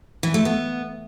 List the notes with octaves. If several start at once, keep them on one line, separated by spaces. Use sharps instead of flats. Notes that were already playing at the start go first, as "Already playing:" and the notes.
E3
A3
B3